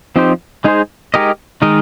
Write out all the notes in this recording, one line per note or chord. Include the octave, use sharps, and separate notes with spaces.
F3 C4 D#4 G4 C5
G#3 D#4 G#4 C5
G#3 D#4 G4 A#4 D#5
D#3 G#3 D#4 A#4 D#5